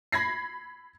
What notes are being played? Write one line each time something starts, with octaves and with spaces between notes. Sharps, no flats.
B5 G#6 A#6 C7